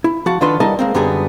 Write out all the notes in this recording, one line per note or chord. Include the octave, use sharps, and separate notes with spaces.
E4
F3 F#4 F#5 A5
D3 D#3 D4 F4 B4 C6
D3 G3 E4 A#4 D#5 A5
G#3 A#3 C4
F#2 D3 F#3 G3 B3 G#4